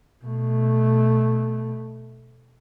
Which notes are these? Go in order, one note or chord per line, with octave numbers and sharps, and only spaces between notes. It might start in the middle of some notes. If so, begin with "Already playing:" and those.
B2 A3